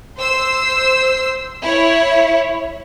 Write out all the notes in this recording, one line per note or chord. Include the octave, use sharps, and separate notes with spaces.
C5 E6 C7
E4 C#5